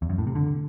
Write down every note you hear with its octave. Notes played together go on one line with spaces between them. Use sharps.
E2
F#2
A2
C3
D3